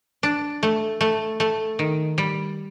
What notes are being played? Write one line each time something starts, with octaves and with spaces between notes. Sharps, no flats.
D4
A3
A3
A3
D#3
G3